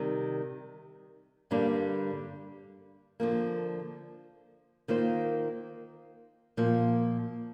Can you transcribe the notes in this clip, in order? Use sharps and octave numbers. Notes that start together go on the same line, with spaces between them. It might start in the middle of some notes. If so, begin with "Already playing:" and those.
Already playing: C3 D#3 G3
G2 D3 G3 A#3 D4
D3 F3 A#3
D#3 A#3 F4 C5
A#2 F3 A#3